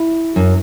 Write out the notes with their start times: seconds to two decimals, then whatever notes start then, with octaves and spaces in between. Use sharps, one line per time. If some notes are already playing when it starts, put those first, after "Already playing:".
Already playing: E4
0.36 F#2